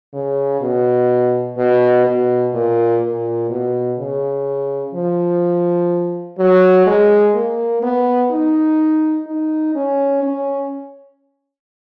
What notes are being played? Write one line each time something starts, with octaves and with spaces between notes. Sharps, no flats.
C#3
B2
B2
B2
A#2
A#2
B2
C#3
F3
F#3
G#3
A#3
B3
D#4
D#4
C#4
C#4